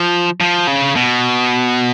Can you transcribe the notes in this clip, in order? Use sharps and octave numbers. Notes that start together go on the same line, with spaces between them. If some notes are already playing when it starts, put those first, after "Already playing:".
Already playing: F3
F3
C#3
B2